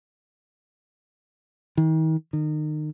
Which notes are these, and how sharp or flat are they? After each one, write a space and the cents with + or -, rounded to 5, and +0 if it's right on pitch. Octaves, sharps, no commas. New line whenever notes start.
D#3 +40
D#3 -30